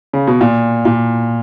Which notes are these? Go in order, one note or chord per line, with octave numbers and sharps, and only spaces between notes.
C#3
B2
A#2
A#2